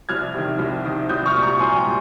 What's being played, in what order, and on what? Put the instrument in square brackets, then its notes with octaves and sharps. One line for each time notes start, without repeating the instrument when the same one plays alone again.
[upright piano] C2 F6 G#6
C3 D#3
C2
C3 D#3
C2 D#6 G6
C#6 F6
A#2 G3
A#5 C#6
C2 G#5 C6
G5 A#5
A#2 G3